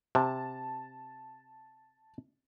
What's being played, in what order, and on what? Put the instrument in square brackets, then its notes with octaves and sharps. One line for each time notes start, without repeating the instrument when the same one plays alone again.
[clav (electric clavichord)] C3 [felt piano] A5